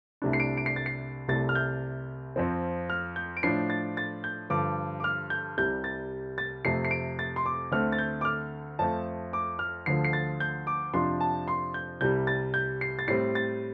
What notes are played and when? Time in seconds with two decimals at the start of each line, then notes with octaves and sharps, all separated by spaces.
0.22 C2 C3 A3 D4
0.33 C7
0.40 D7
0.57 D7
0.66 C7
0.76 A6
0.86 C7
1.28 C2 C3 A3 A6
1.49 F6
1.55 G6
2.36 F2 F3 C4
2.90 F6
3.16 G6
3.37 D7
3.43 A2 F3 D4 C7
3.70 A6
3.97 A6
4.24 G6
4.50 G2 D3 F3 D6
5.00 D6
5.04 F6
5.30 G6
5.58 C2 C3 G3 G6
5.84 A6
6.38 A6
6.65 F2 C3 A3 C7
6.85 C7
6.91 D7
7.19 A6
7.36 C6
7.46 D6
7.72 D2 D3 A3 C4 F6
7.92 A6
7.99 G6
8.21 D6
8.25 F6
8.79 F2 F3 A3 A5
9.33 D6
9.59 F6
9.86 D2 D3 F3 C7
10.04 C7
10.13 A6
10.40 G6
10.67 D6
10.94 F2 C3 F3 D4 C6
11.20 A5
11.48 C6
11.74 G6
12.01 C2 C3 G3 G6
12.27 A6
12.54 G6
12.81 C7
12.99 A6
13.08 A2 G3 C4 C7
13.35 A6